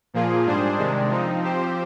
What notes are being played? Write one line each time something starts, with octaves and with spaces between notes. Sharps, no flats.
A#2 F3 A#3 F4 G#4
G#2 G3 D4 G#4 C5
C3 D#3 G#3 D4
F3 C4 D#4
F3 C4 G4 C5